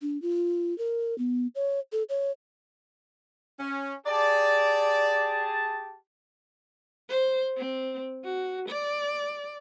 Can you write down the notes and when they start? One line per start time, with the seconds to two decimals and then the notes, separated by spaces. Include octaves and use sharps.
0.02 D4
0.22 F4
0.78 A#4
1.18 B3
1.55 C#5
1.92 A4
2.09 C#5
3.60 C#4
4.07 G4 G#4 D5 A5
7.09 C5
7.58 C4
8.24 F#4
8.69 D5